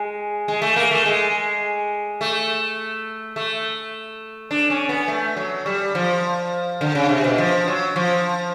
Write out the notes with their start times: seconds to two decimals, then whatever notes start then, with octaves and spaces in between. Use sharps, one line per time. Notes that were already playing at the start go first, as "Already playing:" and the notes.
Already playing: G#3
0.48 G#3
0.62 A3
0.76 A#3
0.91 A3
1.05 G#3
2.21 A3
3.36 A3
4.51 D4
4.70 C#4
4.89 B3
5.08 A3
5.37 F#3
5.66 G3
5.95 F3
6.81 D3
6.95 C#3
7.09 C3
7.24 B2
7.38 F3
7.67 F#3
7.96 F3